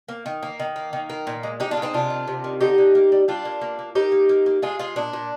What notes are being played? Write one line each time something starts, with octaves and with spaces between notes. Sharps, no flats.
A#3
D#3
A#3
D#3
A#3
D#3
A#3
A#2
G#3
G#3 D#4 G4
D4 F4
G#3
C4 D#4
C3 D4 F4
D#3
C3
D#3
D3 D#4 G4
D3
A#3
G3
G3 D4 F4
A#3
A#3
A#3
A#3 D#4 G4
A#3
A#3
A#3
G#3 F4 G#4
G#3 F4 G#4
A#2 D4
A#2